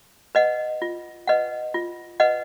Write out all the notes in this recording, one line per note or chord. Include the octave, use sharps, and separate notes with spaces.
B4 D#5 F#5
F4
B4 D#5 F#5
F4
B4 D#5 F#5